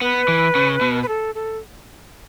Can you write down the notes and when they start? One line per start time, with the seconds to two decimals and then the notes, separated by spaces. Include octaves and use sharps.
0.02 B3 B4
0.28 E3
0.55 C#3
0.81 B2
1.03 B4
1.08 A4
1.35 A4